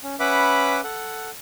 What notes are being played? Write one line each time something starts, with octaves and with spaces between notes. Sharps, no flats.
C#4
C#4 B4 E5 F#5 B5 D6
A4 F#5